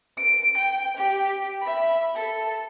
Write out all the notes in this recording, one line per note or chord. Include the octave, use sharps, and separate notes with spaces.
D7
G5
G4
E5 B5
A4